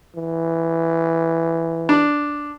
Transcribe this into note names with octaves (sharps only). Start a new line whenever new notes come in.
E3
D4